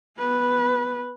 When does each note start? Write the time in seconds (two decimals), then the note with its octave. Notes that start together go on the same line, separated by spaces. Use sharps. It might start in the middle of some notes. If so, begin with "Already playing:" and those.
0.18 B3 B4